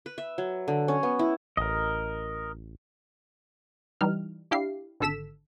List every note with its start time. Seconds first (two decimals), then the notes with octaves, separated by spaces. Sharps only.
0.06 B4
0.18 E5
0.38 F#3
0.68 D3
0.88 C#4
1.03 B3
1.19 E4
1.57 A1 A#4 D#5
4.01 E3 G3 D#4 F6
4.51 D4 E4 G4 F5 C7
5.00 G#1 D3 A4 E6 B6 E7